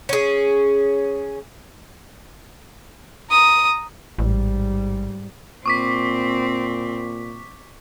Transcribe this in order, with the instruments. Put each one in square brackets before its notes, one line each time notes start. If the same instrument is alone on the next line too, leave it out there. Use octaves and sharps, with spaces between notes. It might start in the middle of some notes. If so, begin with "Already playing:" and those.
[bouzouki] C#4 G#4
[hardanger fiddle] A#5 D#6
[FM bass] A1 [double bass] G#2 G3
[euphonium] A#2 [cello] C4 [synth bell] C#6 D6 B6